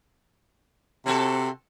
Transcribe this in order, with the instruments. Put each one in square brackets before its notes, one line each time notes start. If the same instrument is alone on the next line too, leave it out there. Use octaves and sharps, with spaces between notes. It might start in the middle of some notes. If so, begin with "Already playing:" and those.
[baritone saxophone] C3 [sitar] C4 F#4 A4